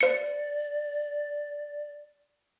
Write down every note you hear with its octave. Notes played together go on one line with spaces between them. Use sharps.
C5 D5 C#7